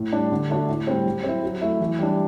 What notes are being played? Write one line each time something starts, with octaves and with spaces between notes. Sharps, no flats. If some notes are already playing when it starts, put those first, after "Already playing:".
Already playing: A2
G3 D4
D3
A3 D4 F#4
A2
G3 C4
F#3
C4 E4
F#3
A3 E4
E3
G3 D4